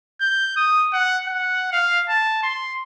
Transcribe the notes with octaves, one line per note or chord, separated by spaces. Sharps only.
G6
D#6
F#5
F#5
F5
A5
C6